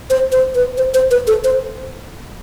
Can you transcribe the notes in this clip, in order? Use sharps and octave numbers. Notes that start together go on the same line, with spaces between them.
C5
C5
B4
C5
C5
B4
A4
C5